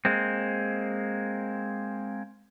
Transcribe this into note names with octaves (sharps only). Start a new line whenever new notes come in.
G#3 A#3 C4